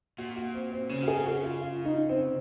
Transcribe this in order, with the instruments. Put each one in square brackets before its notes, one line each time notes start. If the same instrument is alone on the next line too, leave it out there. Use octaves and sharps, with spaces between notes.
[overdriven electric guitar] A#2 [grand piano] F#4
[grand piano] F#4
C4
C4
[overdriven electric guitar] C#3 [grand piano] C#4
[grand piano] F#4
G#4
F#4
F4
F4
D#4
C4